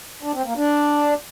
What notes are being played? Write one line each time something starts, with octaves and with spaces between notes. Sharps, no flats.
D4
C4
A#3
D4